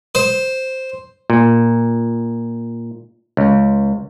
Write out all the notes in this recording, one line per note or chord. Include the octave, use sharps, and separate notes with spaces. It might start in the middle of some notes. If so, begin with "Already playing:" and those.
C5
A#2
C#2